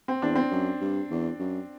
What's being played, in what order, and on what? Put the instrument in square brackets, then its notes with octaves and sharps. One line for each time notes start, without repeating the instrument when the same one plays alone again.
[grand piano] C4
[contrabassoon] E2 [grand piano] D4
[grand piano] C4
[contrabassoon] F#2
G2
E2
F#2